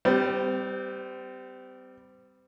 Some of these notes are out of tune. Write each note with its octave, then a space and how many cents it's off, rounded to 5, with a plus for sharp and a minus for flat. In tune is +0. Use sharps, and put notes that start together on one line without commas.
G3 +0 C4 -35